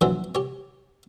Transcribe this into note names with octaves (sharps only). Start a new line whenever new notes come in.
A#1 E3 F#3 D4 C5 E5
G4 C#5